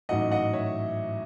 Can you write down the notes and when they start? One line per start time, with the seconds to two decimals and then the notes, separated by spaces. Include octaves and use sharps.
0.09 A1 G#2 F#3 A3 D#5 F#5
0.32 D#5 F#5
0.53 C#5 E5